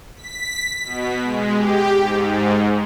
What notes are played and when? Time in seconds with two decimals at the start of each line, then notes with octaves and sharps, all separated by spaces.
0.16 B6
0.84 B2
1.23 G#3
1.54 G4
1.90 G#2